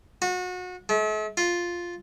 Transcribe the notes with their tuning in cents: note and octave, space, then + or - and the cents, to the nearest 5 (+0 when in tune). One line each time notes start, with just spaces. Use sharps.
F#4 -30
A3 -45
F4 +0